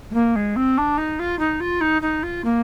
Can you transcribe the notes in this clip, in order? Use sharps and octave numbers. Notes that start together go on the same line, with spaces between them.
G#3
A#3
G#3
C4
D4
D#4
F4
D#4
F4
D#4
D#4
F4
A#3